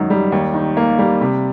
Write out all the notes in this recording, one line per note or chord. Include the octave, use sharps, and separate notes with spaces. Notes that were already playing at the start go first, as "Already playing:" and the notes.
Already playing: F#2 D#3
G3
D#2
D#3
A#3
G3
C3